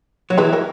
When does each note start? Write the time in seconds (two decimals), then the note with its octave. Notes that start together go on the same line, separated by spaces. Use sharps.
0.30 F#3
0.38 E3 G#4 B4
0.53 F#4 A#4